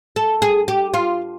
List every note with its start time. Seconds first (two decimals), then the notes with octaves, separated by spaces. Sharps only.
0.16 A4
0.42 G#4
0.68 G4
0.94 F4